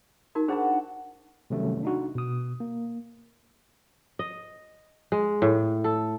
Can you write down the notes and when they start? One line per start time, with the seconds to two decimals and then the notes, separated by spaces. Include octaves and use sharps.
0.35 D#4 F#4 A#4
0.48 D4 F#4 G#4 C5 A5 B5
1.50 C3 D#3 F#3 G3 A3 C#4
1.83 D4 D#4 F#4
2.15 B2 D#6
2.60 A#3
4.19 D#5
5.12 G#3
5.42 A2
5.84 A4